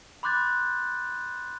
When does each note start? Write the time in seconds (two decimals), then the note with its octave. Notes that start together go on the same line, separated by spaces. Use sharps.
0.23 B5 C6 D6 F#6 G6 A6